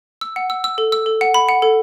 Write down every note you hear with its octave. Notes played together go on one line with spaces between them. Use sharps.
E6
F#5
E6
E6
A4
E6
A4
F#5
B5
F#5
A4